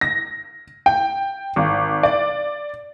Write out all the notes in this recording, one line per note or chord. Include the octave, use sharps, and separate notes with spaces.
A#6
G5
G#1
D5